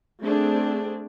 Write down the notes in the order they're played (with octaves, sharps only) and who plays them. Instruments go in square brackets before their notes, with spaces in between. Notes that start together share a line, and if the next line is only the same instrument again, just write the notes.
[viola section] A3 C4 D4 G#4